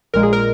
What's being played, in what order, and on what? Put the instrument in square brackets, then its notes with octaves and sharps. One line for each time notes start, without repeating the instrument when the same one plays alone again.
[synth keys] A#1 A#2 G#3 A#4
G#4
A#4